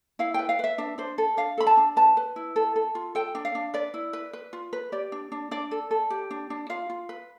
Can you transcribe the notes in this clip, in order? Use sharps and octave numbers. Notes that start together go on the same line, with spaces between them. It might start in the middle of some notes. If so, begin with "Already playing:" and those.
E4 F5
B4 G5
F5
B4 E5
D4 E5
D4 C5
A4
D4 F5
A4 B5
A5
D4
B4 A5
B4
E4
A4
A4
F4
A4 G5
D4
F5
D4
B4 D5
E4
B4
B4
F4
B4
G4 D5
D4
D4
D4 D5
A4
A4
G4
D4
D4
F4 F5
F4
B4